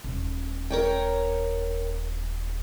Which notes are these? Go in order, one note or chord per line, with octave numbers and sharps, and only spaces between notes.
D#1
A#4 C#5 G5